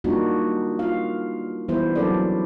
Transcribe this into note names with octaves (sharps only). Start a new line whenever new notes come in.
G3 A#3 D4 D#4 F4 F#4
F4 F5
E3 G3 B3 E4 C5
F#3 C#4 D4 A4 A#4 D5